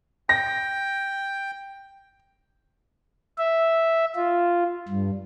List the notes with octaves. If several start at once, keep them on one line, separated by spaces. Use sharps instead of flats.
G5 A#6
E5
F4
G2